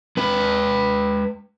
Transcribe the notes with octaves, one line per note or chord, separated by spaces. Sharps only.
G#3 B4